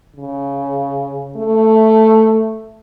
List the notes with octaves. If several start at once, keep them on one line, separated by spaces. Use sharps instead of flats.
C#3
A3